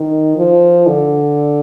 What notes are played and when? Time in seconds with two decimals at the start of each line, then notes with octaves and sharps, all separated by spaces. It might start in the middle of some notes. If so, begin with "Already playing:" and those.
Already playing: D#3
0.37 F3
0.87 D3